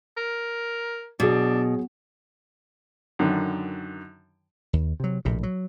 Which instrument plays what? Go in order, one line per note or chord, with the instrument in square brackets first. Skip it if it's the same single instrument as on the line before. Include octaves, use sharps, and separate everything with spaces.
[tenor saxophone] A#4
[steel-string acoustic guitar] B2 [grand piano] F#3 G#4 [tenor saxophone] D4
[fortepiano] F#2 D3 D#3
[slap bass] D#2
C3 F#3
A#1 A2 C3
F#3